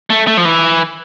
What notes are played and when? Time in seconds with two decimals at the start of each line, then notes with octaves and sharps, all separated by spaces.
0.10 A3
0.27 A3
0.37 F3
0.45 E3